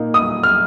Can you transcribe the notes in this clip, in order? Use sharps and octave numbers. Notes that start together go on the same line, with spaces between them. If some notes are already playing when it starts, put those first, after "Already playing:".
Already playing: A#2 A#3 D#4
D#6
F6